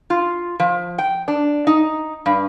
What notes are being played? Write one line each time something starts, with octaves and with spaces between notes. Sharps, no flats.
F4
F3
G5
D4
D#4
G2